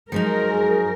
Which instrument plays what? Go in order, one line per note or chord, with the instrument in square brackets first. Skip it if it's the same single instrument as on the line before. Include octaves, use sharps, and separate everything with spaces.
[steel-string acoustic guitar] F3 F#3 D#4 [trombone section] G#3 [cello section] A#4
[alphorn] G#4